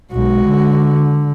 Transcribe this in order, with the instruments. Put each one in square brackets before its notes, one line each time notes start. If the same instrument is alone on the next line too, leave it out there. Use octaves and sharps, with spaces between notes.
[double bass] B1 [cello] G#3 F#4
[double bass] D3